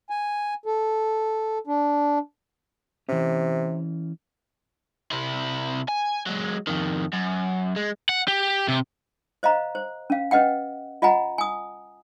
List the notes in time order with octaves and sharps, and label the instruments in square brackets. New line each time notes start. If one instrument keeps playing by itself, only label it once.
[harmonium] G#5
A4
D4
[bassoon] C3 [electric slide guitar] E3 C#4
[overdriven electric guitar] C3 E4
G#5
F#3 G#3
F2 D#3
F#2
G#3
F#5
G4
C3
[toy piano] C5 D#5 F5 A#5
C5
C#4 F5
C#4 B4 D#5 F#5 G5
F4 D#5 F#5 G#5 A#5
G#5 D#6